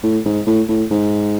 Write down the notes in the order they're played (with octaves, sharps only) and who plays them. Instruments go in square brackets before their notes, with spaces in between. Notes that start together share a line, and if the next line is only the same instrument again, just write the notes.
[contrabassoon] A2
G#2
A2
A2
G#2